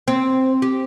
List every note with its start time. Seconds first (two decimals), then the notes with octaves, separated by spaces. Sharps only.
0.08 C4
0.62 G4